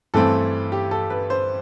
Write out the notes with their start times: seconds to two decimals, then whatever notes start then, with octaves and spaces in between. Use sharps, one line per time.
0.14 G2 E3 A3 C4 A4
0.72 G4
0.91 A4
1.10 B4
1.30 C5